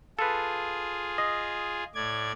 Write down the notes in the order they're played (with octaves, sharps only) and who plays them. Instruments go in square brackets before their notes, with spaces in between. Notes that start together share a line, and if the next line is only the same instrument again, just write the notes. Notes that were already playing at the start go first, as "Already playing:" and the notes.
[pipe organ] F4 G#4 [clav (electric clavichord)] A4 B4
[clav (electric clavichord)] D#5
[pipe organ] A2 D5 G#6